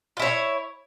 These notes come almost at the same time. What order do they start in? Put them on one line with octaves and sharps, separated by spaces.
F4 E4 C#5